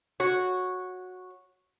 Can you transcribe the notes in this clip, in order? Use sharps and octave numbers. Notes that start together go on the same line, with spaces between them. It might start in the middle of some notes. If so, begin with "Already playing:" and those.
F#4 C#5